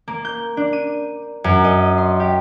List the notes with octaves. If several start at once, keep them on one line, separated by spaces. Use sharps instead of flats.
A#3
G6
D4
D#7
F#2
D#5
C6
G4